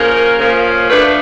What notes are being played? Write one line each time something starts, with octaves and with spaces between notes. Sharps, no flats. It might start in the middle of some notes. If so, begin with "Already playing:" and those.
Already playing: C#3 F3 A#3 C#4 A#4
C#3 F3 A#3 C#4
F3 A3 D4 B4